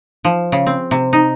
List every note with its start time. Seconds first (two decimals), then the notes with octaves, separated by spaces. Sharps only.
0.25 F3
0.52 C#3
0.67 C4
0.91 C3
1.13 D#4